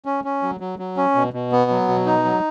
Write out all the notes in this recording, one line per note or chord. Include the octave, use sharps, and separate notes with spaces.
C#4
C#4
F#3
F#3
F#3
C#4
B2
B2
B3
F#3
B2
D#4
F#3